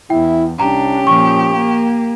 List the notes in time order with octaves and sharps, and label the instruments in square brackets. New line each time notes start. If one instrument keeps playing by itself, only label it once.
[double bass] E2 [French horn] E4 [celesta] G5
[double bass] C2 D4 [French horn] C#4 [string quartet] G4 [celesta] A#5
[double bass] A#2 F3 [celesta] C#6
[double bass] A#3